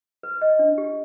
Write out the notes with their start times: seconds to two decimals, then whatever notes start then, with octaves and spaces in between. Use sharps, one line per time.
0.23 B4
0.42 D#5
0.59 D4
0.78 G4